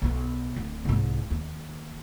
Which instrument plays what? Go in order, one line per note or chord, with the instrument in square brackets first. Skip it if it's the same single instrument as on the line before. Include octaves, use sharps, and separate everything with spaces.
[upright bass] B1 B3
D1
C2 G#2
D#2